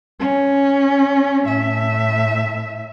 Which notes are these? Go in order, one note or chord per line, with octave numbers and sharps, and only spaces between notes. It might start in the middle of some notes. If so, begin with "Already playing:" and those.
C#4
A2 E5